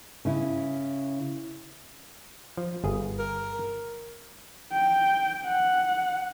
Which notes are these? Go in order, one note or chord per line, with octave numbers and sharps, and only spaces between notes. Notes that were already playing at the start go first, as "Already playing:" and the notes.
C#3 E4
F3
G1 G#4
A#4
G5
F#5